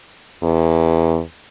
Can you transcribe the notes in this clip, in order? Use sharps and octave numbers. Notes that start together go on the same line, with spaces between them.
E2